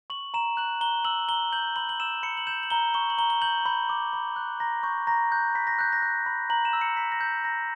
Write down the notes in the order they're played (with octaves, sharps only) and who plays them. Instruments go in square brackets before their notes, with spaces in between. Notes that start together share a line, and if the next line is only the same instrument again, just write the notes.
[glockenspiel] C#6 F#7
A#5 E7
F#6 F#7
A#5 G7
E6 F#7
A#5 G7
G6 F#7
B5 F#7
F#7
E6 E7
B5 C#7
F#7
G6 E7
F#7
A#5 G7
C#6 G7
F#7
A#5 G7
G7
G6 F#7
B5 G6
D6
B5
F#6
A#5 A#6
C#6 G6
A#5 A#6
F#6 G6
B5 B6
A#6
F#6 G6
A#6
F#6
B5
A#5 F#7
E7
E6
C#7
A#5 B6
A#6
G6
A#5 A#6